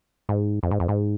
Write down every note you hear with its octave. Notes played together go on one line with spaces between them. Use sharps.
G#2
F2
G#2
F2
G#2